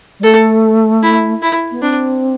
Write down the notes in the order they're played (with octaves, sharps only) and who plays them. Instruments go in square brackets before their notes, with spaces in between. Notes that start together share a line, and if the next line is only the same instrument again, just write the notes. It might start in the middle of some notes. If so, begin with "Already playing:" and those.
[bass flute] G3
[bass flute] A3 [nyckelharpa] A4
[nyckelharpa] E4
E4
[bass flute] B3
[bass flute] C4 [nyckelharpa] D4